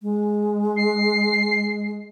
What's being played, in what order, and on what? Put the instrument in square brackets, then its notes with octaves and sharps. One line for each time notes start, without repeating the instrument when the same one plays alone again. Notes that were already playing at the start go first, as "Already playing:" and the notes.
[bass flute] G#3
[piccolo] C7